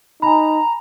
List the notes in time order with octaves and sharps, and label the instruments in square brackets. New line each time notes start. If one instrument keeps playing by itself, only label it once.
[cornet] D#4 [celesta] G#5 B5 [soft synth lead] A#5